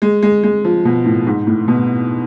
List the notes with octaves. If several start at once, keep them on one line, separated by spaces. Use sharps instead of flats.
G#3
G#3
G#3
F3
B2
A2
G#2
A2
B2